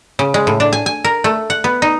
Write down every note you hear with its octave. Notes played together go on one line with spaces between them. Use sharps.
C#3
G#3
A2
D4
G#5
G#5
A#4
A3
F#5
B3
D#4